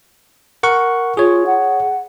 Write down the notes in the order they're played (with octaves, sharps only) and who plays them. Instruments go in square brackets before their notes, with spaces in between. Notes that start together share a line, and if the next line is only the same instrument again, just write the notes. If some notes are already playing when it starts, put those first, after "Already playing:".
[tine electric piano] A#4 F#5 C#6
[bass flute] F4 [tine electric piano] G#4 C#5
[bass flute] F#5